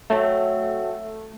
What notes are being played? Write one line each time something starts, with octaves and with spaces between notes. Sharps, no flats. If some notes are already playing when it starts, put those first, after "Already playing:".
F#3 A3 C4 E5